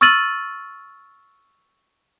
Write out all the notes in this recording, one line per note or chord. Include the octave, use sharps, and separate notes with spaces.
C#6 E6 F6 A6 D#7 F#7